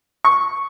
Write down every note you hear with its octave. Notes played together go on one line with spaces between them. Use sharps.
C#6